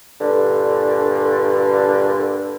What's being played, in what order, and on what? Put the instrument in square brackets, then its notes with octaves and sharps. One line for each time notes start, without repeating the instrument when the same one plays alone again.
[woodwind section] G2 A#2 D3